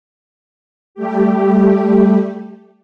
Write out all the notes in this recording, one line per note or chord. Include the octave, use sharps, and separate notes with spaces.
G3 A3 G4